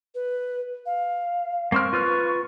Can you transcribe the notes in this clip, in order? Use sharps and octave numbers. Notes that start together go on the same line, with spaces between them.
B4
F5
A#3 C4 C#6 F6
F4 B4 F6